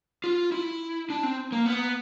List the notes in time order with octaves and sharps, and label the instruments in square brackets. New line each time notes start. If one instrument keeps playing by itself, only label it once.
[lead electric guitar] F4
E4
D4
C4
A#3
B3